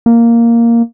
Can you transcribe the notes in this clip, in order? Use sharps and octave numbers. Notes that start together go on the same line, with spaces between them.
A#3